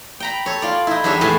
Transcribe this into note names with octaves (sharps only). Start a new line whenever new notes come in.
G5 A#5 B5
A4 C#5
F4 D5
D#4 E4
E2 G3 D4 C#5 E5 G#5
E2 A2 A4 G#5